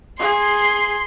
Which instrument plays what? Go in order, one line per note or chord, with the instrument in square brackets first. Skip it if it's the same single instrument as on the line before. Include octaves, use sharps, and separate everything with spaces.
[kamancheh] G#4 [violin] C6